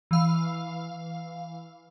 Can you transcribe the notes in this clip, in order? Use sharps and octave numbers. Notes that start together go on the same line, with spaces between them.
E3 F5